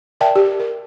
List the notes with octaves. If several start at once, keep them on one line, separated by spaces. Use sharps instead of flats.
A#4 D5 E5 G5 A5
G4
A#4